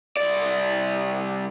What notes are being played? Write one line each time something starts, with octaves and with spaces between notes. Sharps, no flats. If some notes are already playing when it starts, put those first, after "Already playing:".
C2 D5